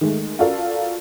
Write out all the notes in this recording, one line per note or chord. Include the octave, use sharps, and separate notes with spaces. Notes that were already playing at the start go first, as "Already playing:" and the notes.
D#3 G#3 A3
F4 F#4 A4 A#4 D5 F5